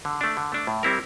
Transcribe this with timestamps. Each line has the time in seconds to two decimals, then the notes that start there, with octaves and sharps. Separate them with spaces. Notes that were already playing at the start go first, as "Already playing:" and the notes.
0.05 D3
0.21 A3 D4
0.37 D3
0.52 A3 D4
0.67 A2
0.83 G3 C4 E4 A#4